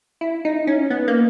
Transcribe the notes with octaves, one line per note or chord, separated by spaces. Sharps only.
E4
D#4
C#4
B3
A#3